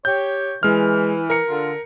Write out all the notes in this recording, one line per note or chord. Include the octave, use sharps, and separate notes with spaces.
G4 C#5 G6
E3 G#3 F6
A#4 A#5 C#7
D3 F4